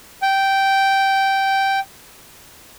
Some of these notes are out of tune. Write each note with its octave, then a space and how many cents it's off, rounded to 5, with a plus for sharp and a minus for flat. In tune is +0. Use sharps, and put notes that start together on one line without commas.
G5 -10